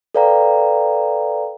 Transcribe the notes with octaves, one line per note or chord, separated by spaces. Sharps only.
A4 B4 D5 F5 G5 A#5